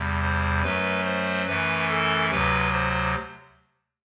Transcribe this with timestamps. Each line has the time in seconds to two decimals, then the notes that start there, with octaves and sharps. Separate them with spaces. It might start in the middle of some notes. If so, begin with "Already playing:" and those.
Already playing: E2 C3 G3
0.20 C5
0.62 F#2 F#3 A3 B4
1.04 C5
1.46 F#2 E3 A3 B4
1.89 A4
2.31 D2 C3 F#3 B4
2.73 C5